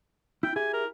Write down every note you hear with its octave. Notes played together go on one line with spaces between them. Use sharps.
E4 G5
E4 G4 G#4 G#5
A#4